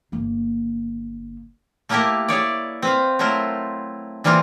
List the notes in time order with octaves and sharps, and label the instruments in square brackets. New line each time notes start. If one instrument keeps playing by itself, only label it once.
[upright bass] G1 A#3
[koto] A3 A#3 E4 G4 A4 A#4
E4 G#4 C#5 D5
C4 B4 F5
F#3 A3 E4 F4 A#4 C5
E3 G3 A#3 C4 F4